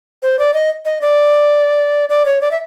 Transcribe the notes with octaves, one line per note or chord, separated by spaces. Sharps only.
C5
D5
D#5
D#5
D5
D5
C#5
D5
E5